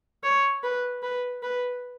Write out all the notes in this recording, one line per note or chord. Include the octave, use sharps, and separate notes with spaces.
C#5
B4
B4
B4